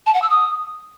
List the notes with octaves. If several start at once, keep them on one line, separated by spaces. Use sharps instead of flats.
A5
F#5
E6
D#6